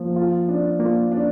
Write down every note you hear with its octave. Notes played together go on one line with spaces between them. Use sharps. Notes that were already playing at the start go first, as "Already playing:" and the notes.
Already playing: F3 A#3
F4
D4
A#3 F4
D4